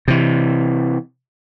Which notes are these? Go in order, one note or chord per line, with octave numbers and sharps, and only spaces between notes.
C3 E3